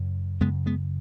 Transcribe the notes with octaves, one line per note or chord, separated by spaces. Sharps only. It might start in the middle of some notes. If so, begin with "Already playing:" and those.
Already playing: F#2 C#3
F#2 C#3 G#3 B3
G#3 B3